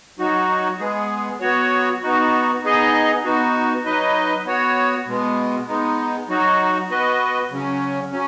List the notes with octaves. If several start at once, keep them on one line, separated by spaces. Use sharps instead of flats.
F#3 D#4 F#4
G#3 B3 G#4
F#3 B3 F#4 C#5
B3 D#4 F#4
B3 D#4 G#4 D#5
B3 D#4 F#4
F#3 D#4 B4 D#5
B3 F#4 C#5
B2 G#3 B3
G#3 B3 D#4
F#3 D#4 F#4
B3 F#4 B4 D#5
C#3 F#3 C#4
F#3 C#4